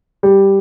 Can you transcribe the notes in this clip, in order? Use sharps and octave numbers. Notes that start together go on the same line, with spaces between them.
G3